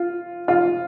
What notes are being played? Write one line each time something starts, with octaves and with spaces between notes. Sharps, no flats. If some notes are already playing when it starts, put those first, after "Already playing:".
Already playing: F4
F4